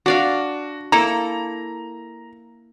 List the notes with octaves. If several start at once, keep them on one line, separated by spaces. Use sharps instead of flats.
D4 F#4 D5 F5
A#3 E4 A4 A#5